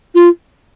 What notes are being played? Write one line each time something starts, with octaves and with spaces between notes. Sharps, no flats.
F4